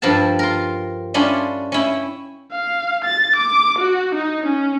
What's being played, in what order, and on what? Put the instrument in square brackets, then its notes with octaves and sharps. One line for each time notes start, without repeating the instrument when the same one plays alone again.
[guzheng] G2 F3 A4 A#4 A5
F4 A#4
G3 C#4 D4 E4 F4
C#4 E4 G5
[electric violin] F5
A6
D6
F#4
D#4
C#4